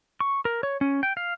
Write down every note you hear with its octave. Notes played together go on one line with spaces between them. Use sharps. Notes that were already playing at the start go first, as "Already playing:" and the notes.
C#6
A#4
C#5
C#4
G5
F5